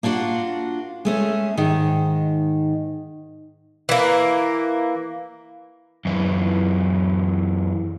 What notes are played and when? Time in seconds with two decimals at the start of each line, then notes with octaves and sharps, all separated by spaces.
0.03 A#3 D4 F4 F#4 F#5
1.05 G#3 A3 C#4
1.57 G#2 D#3
3.89 E3 A#3
6.05 F#2 E3